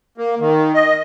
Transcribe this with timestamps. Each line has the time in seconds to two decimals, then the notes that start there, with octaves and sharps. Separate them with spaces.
0.18 A#3
0.40 D#3
0.74 D#5